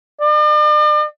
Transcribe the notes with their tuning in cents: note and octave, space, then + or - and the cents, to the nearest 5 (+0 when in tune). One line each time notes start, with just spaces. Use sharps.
D5 +45